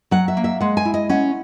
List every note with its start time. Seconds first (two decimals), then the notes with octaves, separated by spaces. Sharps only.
0.11 F#3 F#5
0.28 E5
0.37 A#3
0.44 E5
0.60 G#3 F#5
0.77 G#5
0.85 E4
0.94 D#5
1.09 C#4 F#5